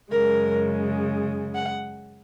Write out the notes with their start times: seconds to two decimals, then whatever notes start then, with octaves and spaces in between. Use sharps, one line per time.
0.12 F#2 C#3 G#3 A#4
1.55 F#5